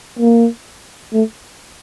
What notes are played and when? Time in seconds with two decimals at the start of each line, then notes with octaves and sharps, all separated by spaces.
0.19 A#3
1.13 A3